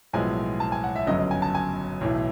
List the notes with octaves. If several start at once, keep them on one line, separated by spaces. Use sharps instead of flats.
B1 A2 F3 G#3 B3 G#5
A5
G#5
F#5
E5
G1 F#2 C#3 F#3 D#5
D#5
G#5
A5
G#5
B1 A2 E3